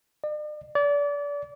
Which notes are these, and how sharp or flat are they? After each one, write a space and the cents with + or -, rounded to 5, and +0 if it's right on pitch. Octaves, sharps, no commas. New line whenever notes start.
D5 +45
D5 -30